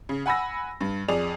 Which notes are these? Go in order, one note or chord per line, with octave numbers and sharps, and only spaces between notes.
C#3
F#5 G#5 B5 E6 A#6
G2
F2 G#4 D5 F7